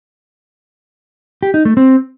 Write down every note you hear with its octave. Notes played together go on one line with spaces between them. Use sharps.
G4
D#4
A3
C4